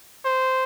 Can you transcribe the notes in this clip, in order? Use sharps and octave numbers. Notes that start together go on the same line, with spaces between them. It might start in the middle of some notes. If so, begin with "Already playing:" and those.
C5